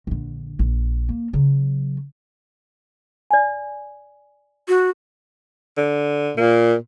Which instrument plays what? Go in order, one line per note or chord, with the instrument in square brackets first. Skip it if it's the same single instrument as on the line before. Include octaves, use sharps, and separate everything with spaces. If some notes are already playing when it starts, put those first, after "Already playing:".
[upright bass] A#1 D3
A#1
A#3
C#3 F#3
[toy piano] D5 G#5
[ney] F#4
[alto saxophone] D3
[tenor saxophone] A#2 [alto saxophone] A#3